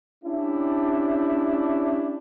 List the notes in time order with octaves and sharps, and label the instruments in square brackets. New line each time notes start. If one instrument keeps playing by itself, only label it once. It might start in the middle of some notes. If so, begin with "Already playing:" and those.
[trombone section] C#4 D4 E4 G4